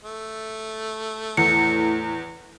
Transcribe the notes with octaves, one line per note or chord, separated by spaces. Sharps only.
A3
E2 A2 C#7